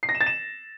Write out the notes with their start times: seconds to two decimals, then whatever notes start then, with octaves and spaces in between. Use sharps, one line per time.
0.03 C7
0.09 A#6
0.15 E7
0.21 A6
0.26 E7